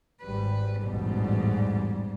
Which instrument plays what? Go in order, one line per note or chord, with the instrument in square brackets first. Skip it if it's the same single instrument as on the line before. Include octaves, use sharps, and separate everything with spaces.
[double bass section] G#1 G3 [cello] B4
[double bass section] A1 E2 B2 [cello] G#2 G3